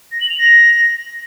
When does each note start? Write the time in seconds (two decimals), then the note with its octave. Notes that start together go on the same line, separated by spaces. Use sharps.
0.12 A#6
0.20 F#7
0.29 F7
0.38 A#6